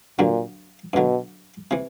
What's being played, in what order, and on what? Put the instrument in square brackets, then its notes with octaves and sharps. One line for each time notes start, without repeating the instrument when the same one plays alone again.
[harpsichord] G2 D3 F#3 [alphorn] A#2
[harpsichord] G2 D3 F#3 [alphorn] B2
[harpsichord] C3 E3